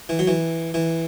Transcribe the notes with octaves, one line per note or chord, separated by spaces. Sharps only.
E3
F#3
E3
E3